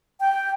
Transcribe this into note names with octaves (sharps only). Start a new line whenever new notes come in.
G5